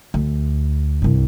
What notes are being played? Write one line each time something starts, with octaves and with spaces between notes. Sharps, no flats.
D2
C2 G2